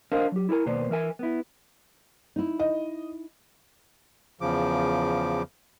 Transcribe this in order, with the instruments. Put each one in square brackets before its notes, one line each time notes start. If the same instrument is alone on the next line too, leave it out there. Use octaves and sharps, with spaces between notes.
[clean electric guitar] D4 A#4 C5 D#5 F5
F#3 G4
E4 A4 A#4 G#5 A#5
D#2 B2 A#3 B4 C5 D5
E3 A#4 E5 G#5
B3 E4
[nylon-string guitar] D#4 E4
[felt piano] D#5
[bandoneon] E2 C#3 F3 D6